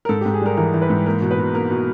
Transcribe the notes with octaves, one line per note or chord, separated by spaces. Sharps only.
A#4
G#2 A4
G4
G#2
G#4
G3 A#4
E3 A#4
E3
B4
G#2
A#3 A#4
B2
B4
B2
A#3 A#4
B2